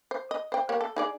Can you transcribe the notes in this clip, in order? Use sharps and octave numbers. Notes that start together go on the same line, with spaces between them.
C5
D#5
C5 G5
A#3 G4 C#5
A4
D#4 G#4 D5